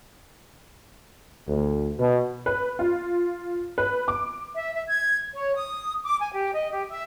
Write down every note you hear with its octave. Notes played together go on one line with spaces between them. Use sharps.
D2
B2
B4
F4
B4
D6
E5
E5
G#6
C#5
D#6
D6
G#5
G4
D#5
G4
E5